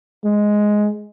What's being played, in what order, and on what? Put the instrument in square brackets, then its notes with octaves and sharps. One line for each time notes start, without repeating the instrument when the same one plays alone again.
[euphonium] G#3